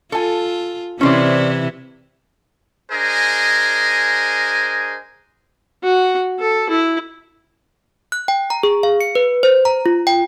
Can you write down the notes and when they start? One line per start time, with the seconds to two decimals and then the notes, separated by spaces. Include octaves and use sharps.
0.12 F4 A4 G#5
1.01 C3 E3 C#4 E4 C5 D5
2.92 D4 G#4 A#4 C5 D#5 G#5
5.83 F#4
6.39 A4
6.69 E4
8.12 F#6
8.28 G5
8.50 A#5
8.63 G#4
8.83 F5
9.01 C#7
9.15 B4
9.43 C5
9.65 A#5
9.86 F4
10.07 G5